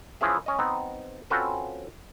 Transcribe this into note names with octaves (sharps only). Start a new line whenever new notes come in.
E3 F3 C#4 E4 G#4 E5
C#4 D#5
B3 C4 D#4
C4 C#4 F4 F#4 A4 B4